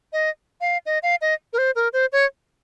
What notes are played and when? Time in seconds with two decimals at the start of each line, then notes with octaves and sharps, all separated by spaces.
0.13 D#5
0.61 F5
0.86 D#5
1.03 F5
1.21 D#5
1.53 A#4
1.58 C5
1.75 A#4
1.93 C5
2.12 C#5